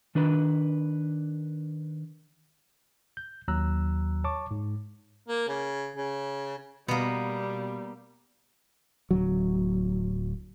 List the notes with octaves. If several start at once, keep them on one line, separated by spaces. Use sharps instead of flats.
D#3 D4 B4
G6
D#2 F#3 A#5 E6 F#6
C#5 A5 C#6 D6
G#2
A#3
C#3
C#3
B2 G3 A#3 B3
D1 F#3